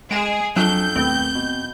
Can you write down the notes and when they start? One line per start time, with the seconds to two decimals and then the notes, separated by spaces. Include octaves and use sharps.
0.11 G#3 G#4 D7 E7
0.56 F2 F#3 D4 G6
0.96 D#2 A2 B3 C4
1.35 B2